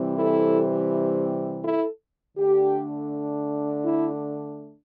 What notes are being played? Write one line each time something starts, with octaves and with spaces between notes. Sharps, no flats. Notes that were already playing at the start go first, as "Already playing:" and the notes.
Already playing: C3 E3 G3 C4
E4 A4
E4 A4
D3 A3 D4 G4
E4